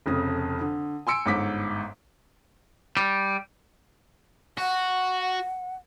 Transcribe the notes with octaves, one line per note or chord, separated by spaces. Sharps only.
F1 F2 C#3 D#6
D3
G#5 C6 E6 C#7 D7
G1 G#2 D6 B6
G3
F#4 F#5